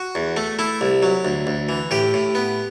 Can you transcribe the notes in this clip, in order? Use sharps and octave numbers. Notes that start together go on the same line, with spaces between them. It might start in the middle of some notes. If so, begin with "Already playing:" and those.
Already playing: F#4
E2
A3
A3 E4
C2
F#3
D2
D2
E3
A2 G4
A2
B3